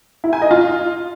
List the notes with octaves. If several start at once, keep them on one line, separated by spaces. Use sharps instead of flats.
E4
G#5
D#5
F4